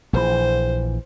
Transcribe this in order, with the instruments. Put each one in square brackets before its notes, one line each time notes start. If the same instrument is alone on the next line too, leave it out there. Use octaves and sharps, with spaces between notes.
[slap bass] A#1 E3 [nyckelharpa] C5